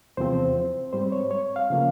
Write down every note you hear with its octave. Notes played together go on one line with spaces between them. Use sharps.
E2 C3 F3 C4 C5
G#2 G3 C4 C5
C#5
C#5
F5
C#3 F3 A#3